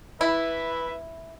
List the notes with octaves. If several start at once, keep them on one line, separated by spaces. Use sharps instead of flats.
E4 B4 E5